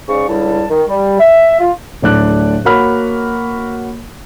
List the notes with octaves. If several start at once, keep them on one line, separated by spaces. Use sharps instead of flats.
G#2 C#3 D5 C#6
C#2 D3 G3 E4 A5
D#3
G3
E5
F4
D1 A2 D4 D5 F#6
A#3 F#4 C#5 B5 F6